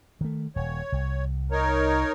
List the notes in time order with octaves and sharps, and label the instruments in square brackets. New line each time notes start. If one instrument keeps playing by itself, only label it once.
[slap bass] D#3 A3
[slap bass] D#1 [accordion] C#5
[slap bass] C2
[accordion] D#4 A#4 C#5